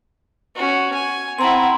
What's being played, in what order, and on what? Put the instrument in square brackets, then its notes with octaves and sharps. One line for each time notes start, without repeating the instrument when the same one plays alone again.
[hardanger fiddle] C#4 F#4
G#5
[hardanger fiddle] C4 E4 [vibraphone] F#5 A#5 C6